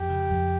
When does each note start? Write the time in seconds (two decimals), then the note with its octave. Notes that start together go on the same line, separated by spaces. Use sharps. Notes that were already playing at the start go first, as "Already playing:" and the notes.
Already playing: F2 G4
0.09 C#3
0.30 F2